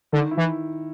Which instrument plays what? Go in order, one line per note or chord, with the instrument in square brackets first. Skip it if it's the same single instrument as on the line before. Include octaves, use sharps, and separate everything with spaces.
[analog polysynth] D3 [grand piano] D#3
[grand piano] E4
[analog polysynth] E3